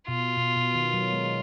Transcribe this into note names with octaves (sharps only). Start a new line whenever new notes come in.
B2 F4
B2
B2
D#3
F#3
G#3